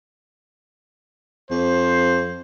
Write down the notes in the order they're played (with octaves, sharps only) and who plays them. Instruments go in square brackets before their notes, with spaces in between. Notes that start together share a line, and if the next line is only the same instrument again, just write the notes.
[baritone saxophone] F2 [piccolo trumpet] C5